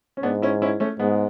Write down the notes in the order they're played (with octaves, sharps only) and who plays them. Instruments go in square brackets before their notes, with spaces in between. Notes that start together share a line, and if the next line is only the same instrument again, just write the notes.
[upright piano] C#4
[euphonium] G#2 [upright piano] B3 D4
[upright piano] C#4 E4
C#4 E4
A3 C#4
[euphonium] G#2 [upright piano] G#3 B3